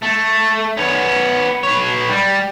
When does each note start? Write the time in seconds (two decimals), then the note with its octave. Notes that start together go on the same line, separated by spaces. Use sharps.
0.03 A3
0.77 B3 C#4
1.63 B4 C#5
2.09 G3